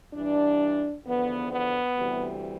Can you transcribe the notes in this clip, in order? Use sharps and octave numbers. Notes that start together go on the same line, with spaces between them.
G2 E3 G3 D4
E2 D3 F3 B3
B3
D2 C3 E3 G3